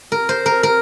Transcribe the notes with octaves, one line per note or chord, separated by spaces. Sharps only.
A#4
C5
A#4
A#4